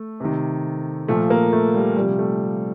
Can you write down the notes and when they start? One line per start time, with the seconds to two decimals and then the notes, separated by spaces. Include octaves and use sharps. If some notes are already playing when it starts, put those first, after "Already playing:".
Already playing: A3
0.20 C3 D#3
1.08 A#2 F3 A3
1.30 A#3
1.53 A3
1.74 G3
1.96 C3 F3 G3
2.19 A3